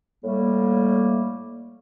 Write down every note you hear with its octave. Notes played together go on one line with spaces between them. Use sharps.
A2 G3 A3 A#3